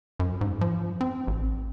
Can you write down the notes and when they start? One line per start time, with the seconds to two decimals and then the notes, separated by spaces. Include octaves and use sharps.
0.19 F#2
0.41 G#2
0.61 F3
1.01 C4
1.27 A1